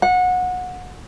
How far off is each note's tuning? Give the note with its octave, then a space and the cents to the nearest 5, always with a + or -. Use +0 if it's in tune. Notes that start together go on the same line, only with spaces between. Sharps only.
F#5 -25